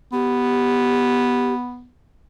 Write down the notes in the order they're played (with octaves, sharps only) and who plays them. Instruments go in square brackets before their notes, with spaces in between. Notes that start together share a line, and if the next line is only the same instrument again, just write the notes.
[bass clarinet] B3 [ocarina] G4